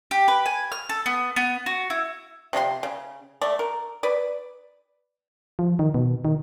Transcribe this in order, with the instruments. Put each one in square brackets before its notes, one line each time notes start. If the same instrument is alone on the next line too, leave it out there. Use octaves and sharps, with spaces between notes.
[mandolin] G4
B4
G#5
F6
A4
B3
B3
F#4
E4
[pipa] C3 F3 C#4 C6
C#3
A3 D5
A#4
B4 D5
[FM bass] F3
D#3
B2
D#3